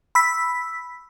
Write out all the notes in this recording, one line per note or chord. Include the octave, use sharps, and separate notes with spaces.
B5 E6 B6